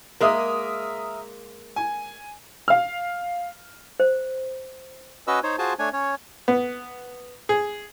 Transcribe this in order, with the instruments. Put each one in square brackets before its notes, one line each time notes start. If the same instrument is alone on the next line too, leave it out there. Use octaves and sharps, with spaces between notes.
[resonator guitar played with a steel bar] G#3 A#3 [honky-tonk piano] A#4 E5 D#6
[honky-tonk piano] G#5
[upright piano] F5 F6
[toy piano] C5
[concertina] C#4 F#4 B4 D#5 E6
D#4 C5 C#5
F4 F#4 G#4 C5 G#5 A5
A3 D4 C#5 G#5
C#4 C#5
[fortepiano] B3
G#4